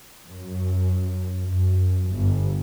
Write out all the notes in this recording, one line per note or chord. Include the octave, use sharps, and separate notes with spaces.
F#2
F#2
G1